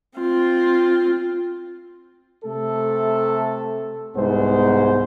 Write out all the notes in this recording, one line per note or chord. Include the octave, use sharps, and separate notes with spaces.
C4 F4
C3 A3 A4
C2 G#2 B3 C5